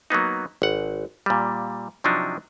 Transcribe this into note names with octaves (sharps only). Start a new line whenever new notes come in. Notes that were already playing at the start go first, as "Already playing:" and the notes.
F#3 A#3 B3 D#4
G#1 F#5
A#2 G3
C3 F3 F#3 D4 D#4